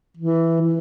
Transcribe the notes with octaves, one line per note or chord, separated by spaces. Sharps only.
E3
E3